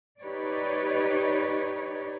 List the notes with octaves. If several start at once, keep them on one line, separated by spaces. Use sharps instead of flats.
D#4 G4 B4 C#5 D5